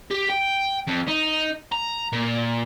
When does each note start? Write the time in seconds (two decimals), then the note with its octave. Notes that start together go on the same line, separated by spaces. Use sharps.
0.11 G4
0.30 G5
0.88 F2
1.08 D#4
1.72 A#5
2.12 A#2